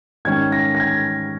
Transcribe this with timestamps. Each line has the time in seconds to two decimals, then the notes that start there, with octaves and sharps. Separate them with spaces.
0.25 G#2 D#3 G3 C#4 G#6
0.52 A#6
0.75 A#6
0.80 G#6